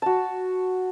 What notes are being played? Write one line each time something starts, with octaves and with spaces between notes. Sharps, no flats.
F#4 A5